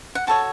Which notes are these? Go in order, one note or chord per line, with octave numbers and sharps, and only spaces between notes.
F#5
F#4 A4 C#5 A5